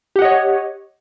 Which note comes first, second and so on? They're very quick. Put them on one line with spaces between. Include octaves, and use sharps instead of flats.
G4 F#5 D#5 C#5